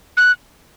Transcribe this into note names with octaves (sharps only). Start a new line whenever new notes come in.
F#6